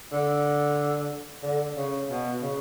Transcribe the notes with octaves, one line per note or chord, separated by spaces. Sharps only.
D3
D3
C#3
B2
C#3